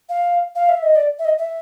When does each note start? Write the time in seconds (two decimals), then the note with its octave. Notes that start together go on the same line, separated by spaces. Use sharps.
0.09 F5
0.55 F5
0.69 E5
0.83 D#5
0.96 D5
1.19 E5
1.25 D#5
1.39 E5